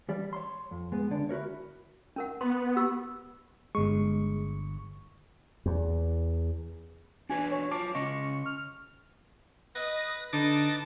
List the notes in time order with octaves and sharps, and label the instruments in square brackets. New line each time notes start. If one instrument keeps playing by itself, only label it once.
[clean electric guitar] E3 G3 D5
C#5 C6
F2
G#3 B3
C#2 D3 D5
E4 F#4 A#4 C#5
[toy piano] C#4 A#4 F#5
[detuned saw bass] B3 [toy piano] C6
[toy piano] G4 E6
[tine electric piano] G1 C#6 [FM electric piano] G#3
[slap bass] E2
[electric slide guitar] D4 F#4 B4 [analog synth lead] G#5
[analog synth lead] C#5
[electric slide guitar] F4 A5 [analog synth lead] D6
[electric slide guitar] C#3 C#4 D#5 [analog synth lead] C#6
[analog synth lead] F6
[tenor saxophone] B4 [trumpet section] D#5 [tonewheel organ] A#6
[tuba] D3 [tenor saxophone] D#4 [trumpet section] B4 A5 [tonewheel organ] D6 A6 A#6